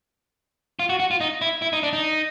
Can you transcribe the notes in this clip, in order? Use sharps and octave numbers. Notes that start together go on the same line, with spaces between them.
F4
F#4
F#4
F4
D#4
E4
E4
D#4
D4
D#4